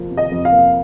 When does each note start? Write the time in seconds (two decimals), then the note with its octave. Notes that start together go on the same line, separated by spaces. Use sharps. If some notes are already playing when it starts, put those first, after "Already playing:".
Already playing: F2 C3 F3 A#3
0.11 C3
0.17 D#5
0.32 F2
0.45 F5
0.51 A#3